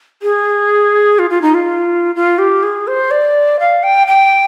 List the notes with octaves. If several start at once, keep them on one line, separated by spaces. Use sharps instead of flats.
G#4
F4
F4
D#4
F4
F4
G4
G#4
C5
D5
F5
G5
G5